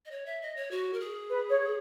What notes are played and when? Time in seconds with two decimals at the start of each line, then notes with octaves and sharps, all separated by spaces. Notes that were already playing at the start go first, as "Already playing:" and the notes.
0.06 D#5
0.11 C#5
0.26 E5
0.42 D#5
0.56 C#5
0.71 F#4
0.93 A#4
1.00 G#4
1.30 B4
1.50 C#5